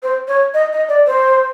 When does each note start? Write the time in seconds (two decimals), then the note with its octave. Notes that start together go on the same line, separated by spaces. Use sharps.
0.03 C5
0.28 C#5
0.54 D#5
0.73 D#5
0.89 D5
1.07 C5